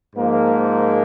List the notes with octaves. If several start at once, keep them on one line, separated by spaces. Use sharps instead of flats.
G#2 F3 A#3